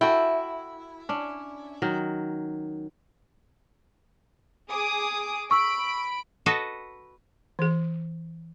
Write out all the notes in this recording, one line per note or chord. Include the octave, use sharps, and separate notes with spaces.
E4 F#4 A4 G5
C#4 D4
D#3 F#3
G#4 D6 D#6
B5 C#6 E6 D7
F#4 A4 B4 D#5
E3 G#4